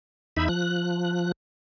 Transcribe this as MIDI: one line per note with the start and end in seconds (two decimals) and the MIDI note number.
0.37 0.48 40
0.37 0.48 63
0.37 0.48 76
0.37 0.48 83
0.49 1.32 53
0.49 1.32 90